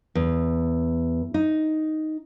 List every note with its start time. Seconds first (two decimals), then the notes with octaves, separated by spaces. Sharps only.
0.15 E2
1.34 D#4